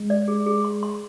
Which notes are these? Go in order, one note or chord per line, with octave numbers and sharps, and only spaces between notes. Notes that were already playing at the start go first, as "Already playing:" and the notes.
Already playing: G#3
D5
G#4
G#4
C6
C6